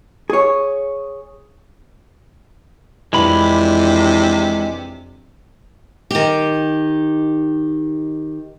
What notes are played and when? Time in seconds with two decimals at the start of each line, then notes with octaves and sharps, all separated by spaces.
0.30 G#4 C#5
3.13 F2 C3 E3 G#3 D4 B5
6.11 D#3 G4